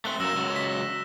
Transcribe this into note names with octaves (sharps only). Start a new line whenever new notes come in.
A3 C4 F#6 G7
F#2 A#3 E6 A#6 E7
C#2 F#3
B6